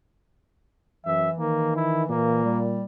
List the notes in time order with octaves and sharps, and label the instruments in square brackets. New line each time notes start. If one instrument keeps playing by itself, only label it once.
[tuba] F#2 [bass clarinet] E3 [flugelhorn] E5
[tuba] D#3 [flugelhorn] A#3
[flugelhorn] E4
[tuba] A#2 [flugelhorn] A#3
[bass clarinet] G3